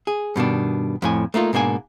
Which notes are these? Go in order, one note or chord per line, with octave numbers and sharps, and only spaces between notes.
G#4
G2 B2 D#3 D4
F2 A2 G#5
A3 A#3 D#4 F4
G#2 B2 A#3 D4 G#5